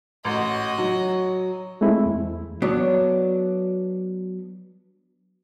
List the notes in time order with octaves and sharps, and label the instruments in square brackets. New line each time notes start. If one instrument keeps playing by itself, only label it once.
[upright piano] A1 [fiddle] F#4 D#5
[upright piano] F#3
[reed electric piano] G#3 A3 C4 E4
E2
[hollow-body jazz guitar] F#3 B3 D4